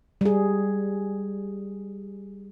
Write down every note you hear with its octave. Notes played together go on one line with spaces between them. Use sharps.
G3 G#4